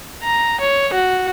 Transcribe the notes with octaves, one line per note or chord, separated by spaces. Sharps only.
A#5
C#5
F#4